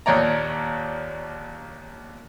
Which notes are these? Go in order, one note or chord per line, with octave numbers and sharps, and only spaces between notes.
A#1 D#2 C#5 D5 A#5